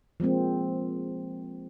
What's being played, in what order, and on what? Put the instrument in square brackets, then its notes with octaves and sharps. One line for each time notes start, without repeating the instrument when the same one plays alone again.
[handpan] F3 G#3 A#3 C4